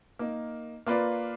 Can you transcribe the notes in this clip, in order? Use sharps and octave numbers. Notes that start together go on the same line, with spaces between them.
A#3 D#4 A#4
A#3 F4 B4 D5